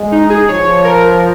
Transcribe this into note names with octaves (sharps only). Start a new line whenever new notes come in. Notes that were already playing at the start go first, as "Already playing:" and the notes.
Already playing: G#3
D#4
G#4
F3 C#5
A#4